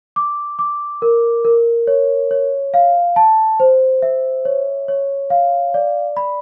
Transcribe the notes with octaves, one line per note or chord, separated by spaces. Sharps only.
D6
D6
A#4
A#4
C#5
C#5
F5
A5
C5
E5
C#5
C#5
F5
D5
B5